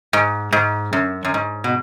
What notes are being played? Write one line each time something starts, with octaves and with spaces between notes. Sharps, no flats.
G#2
G#2
F#2
F#2
G#2
B2